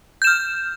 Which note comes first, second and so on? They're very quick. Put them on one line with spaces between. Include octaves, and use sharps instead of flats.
G6 E7 F6